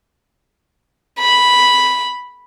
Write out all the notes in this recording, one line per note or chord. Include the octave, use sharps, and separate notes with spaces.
B5